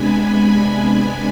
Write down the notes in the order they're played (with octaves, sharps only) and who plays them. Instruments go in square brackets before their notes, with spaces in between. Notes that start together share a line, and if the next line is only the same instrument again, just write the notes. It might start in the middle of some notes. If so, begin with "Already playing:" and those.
Already playing: [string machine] C3 G#3 B3 D4 G#5 B5